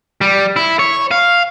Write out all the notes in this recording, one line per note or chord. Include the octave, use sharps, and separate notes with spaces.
G3
E4
C#5
F5